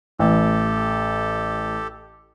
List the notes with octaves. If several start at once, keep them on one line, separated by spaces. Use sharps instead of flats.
A1 G4 A4